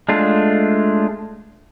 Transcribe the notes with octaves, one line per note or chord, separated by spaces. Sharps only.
G#3 A3 D4 F4